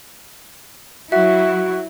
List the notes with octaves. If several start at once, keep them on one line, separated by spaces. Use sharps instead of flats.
F#3 E4 F#4 E5